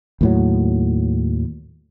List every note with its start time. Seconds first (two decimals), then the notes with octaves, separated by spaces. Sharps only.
0.21 D#2 A2 F#3